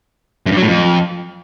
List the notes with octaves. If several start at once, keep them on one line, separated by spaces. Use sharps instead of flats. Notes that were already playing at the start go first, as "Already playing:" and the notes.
F#2
G2
F#3
A2
F2